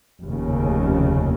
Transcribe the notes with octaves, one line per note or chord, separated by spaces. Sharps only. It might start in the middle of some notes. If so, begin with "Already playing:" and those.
F1 D#2 C#3